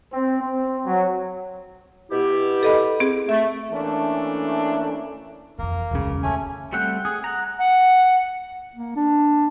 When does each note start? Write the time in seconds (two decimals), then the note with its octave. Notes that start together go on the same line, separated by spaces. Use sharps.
0.13 C4
0.42 C4
0.86 F#3
2.11 B2 E4 G4
2.63 A4 D#5 B5
3.00 C4 G#4
3.29 A3 E5
3.72 E3 A3 A#3 C#4 D4
5.59 F2 E3 A#3 A#4
5.91 E1 C#2 F#2 C#3
6.23 D2 A3 C#4 G#5
6.73 G3 A3 C4 G4 F#5
7.05 G#4
7.24 F#5 A#5
7.59 F#5
8.76 A#3
8.96 D4